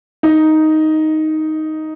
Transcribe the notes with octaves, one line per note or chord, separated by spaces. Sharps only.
D#4